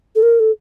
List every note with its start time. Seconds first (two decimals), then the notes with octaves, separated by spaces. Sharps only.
0.16 A4
0.23 A#4
0.40 A4